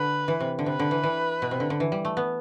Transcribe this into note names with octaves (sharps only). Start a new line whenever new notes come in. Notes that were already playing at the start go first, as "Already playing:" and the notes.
Already playing: D3 B4
E3
C3
D3
C3 B4
D3
E3
E3
B2
C3
D3
D3
E3
G3
A3
B3